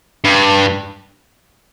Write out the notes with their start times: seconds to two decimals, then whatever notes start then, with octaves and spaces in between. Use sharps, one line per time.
0.25 G2